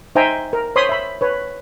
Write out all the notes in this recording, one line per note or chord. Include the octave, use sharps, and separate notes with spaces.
D#4 C5 E5 G5 G#5 A#5
A#4
C5 C#5 B5 C6 D#6
E5 B5
B4 C#5